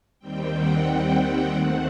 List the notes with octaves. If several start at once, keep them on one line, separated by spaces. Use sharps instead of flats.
D#2 D#3 G3 C4 G5
F#5
D#2 D#3 A3 C4